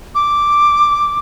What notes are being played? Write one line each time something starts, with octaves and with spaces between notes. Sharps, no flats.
D6